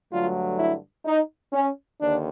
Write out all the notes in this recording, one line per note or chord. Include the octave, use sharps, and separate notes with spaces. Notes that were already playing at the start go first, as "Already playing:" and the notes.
G2 D3 F#3 A3 F4
E4
D#4
C#4
D#2 D3 D4